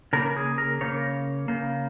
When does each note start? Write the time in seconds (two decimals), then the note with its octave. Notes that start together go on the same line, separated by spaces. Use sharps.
0.13 C#3 A#3 A#4
0.36 G#4
0.58 A#4
0.81 C#3 A#3 C#5
1.48 C#3 A#3